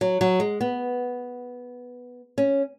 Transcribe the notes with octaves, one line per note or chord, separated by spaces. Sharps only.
F#3
F#3
G#3
B3
C#4